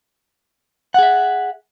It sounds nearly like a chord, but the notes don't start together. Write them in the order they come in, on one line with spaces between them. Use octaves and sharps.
F#5 G#4 E5